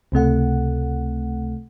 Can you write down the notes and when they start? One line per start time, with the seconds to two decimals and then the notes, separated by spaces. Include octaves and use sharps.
0.12 C#2 C3 A3 F#5